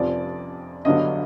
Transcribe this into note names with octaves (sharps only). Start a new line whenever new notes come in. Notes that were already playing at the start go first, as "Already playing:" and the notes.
Already playing: F1 F2 C3 F3 D5
G1 G2 D3 F#3 D#5